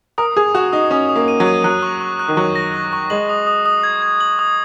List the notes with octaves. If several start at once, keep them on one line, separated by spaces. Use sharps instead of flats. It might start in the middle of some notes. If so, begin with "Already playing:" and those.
A#4 D#6
G#4 D#6
F#4 D#6
D#4 D#6
C#4 D#6
D#6
A#3
D#7
F#3
D#7
F#3 F#6
C#6
C#6
F#6
D#3
F#3 C#6
A#6
C#6
C#6
G#3 F#7
D#6
D#6
D#6
G#6
G#6
F#7
D#6